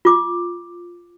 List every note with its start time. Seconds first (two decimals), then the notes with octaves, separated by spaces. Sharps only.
0.05 F4 D6